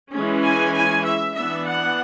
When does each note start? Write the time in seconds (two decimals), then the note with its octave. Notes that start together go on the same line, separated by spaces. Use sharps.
0.14 E3 G#3 C#4
0.44 G#5
0.75 G#5
1.06 E5
1.36 E3 B3 D4 E5
1.67 F#5